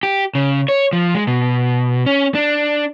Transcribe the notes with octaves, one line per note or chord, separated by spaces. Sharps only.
G4
C#3
C#5
F3
G#3
B2
C#4
D4